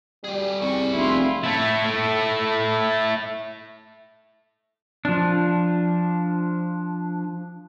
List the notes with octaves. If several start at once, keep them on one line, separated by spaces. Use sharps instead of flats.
G3 G4 G#4
C2 G#4 D5 C#6
F1 E4 F4
A3 E4
F3 D4